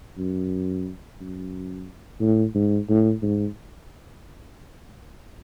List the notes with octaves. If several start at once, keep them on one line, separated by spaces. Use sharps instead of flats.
F#2
F#2
A2
G#2
A2
G#2